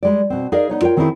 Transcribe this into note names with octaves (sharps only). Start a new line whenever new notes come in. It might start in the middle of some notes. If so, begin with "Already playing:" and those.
G3 G#3 D5
B2 C4
D#4 G#4 A#4 D5 D#5 F5
B3 D#4 C#5
F4 A#4 C#5 G5
D#3 C4 C#4 D#4 E4 G#4